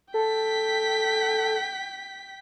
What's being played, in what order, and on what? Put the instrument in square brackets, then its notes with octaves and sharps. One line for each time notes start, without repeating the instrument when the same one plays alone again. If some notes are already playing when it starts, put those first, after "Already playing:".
[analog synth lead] A4 [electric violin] G5 B6